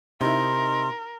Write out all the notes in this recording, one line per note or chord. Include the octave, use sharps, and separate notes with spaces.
C3 D#4 E4 A#4 C6